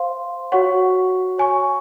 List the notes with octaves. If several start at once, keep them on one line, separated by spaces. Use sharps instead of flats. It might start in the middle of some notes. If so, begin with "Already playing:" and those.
Already playing: C5 F5 C6
F#4 C#5 F#5 C#6
C#5 G#5 C#6